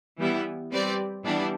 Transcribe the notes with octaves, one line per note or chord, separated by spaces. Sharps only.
E3 G3 B3 E4
G3 C4 G4 B4 D5
E3 G3 B3 D4